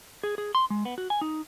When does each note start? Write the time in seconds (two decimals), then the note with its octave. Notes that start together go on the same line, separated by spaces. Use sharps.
0.24 G#4
0.38 G#4
0.55 C6
0.70 G#3
0.85 B3
0.98 F#4
1.10 G#5
1.21 D#4